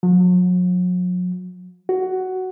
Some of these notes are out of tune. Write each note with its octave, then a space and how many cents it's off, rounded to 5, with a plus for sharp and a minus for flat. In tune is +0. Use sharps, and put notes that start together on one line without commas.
F#3 -45
F#4 +10